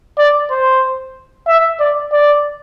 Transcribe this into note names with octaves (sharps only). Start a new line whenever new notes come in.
D5
C5
E5
D5
D5